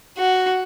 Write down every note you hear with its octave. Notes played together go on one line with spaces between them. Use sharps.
F#4